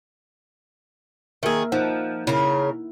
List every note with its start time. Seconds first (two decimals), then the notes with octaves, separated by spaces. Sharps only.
1.43 D#3 A#3 G#4 A#4 E5
1.72 F3 D#4 F#5
2.27 C#3 E4 A#4